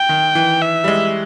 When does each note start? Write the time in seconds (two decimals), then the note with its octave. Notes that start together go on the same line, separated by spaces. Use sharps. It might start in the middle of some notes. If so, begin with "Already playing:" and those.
Already playing: G5
0.09 D#3
0.35 E3
0.62 E5
0.84 G3
0.88 G#3